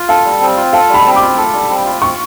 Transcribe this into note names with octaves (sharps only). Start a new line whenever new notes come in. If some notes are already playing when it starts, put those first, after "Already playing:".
Already playing: F4
A4 F5
G3
C4
F4
A4 F5
G3 B5
C4
F4 D6
A4
G3
C4
F4
C4 C#6